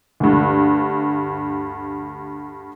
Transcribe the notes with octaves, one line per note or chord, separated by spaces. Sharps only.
D2 G2